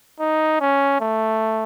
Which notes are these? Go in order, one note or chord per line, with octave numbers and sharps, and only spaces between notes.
D#4
C#4
A3